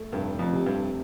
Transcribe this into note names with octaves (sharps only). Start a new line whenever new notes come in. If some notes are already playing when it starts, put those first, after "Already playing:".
Already playing: A3
F1 G2
F2
C3
G2